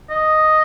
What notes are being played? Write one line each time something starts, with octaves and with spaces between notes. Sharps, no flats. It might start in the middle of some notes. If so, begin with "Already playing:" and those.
D#5